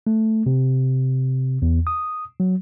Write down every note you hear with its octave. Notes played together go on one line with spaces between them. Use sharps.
A3
C3
E2
D#6
F#3